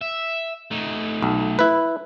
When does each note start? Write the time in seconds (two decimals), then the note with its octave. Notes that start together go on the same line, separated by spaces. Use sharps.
0.01 E5
0.71 A3 D#4
1.22 B1
1.59 E4 B4